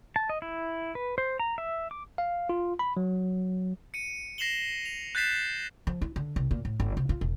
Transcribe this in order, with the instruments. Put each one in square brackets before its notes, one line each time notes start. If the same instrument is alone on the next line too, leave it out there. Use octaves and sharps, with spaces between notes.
[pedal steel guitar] A5
D#5
E4
B4
C5
A#5
E5
D6
[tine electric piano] F5
F4
B5
F#3
[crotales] C#7 D#7
A#6 C7 E7 F#7 G7
F7
F#6 G6 A6 B6 C7 E7
[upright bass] F3
E4
D3
C2
A#2
A2
G1
C3
F4
E1